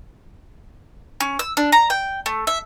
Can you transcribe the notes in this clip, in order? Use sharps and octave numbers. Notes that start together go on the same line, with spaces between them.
C#4
E6
D4
A#5
G5
A3
E5